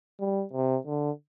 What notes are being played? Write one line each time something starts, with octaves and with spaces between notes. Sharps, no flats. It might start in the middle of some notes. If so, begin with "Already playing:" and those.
G3
C3
D3